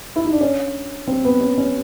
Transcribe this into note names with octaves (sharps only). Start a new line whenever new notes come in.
E4
D#4
D4
C#4
C4
B3
C#4
C#4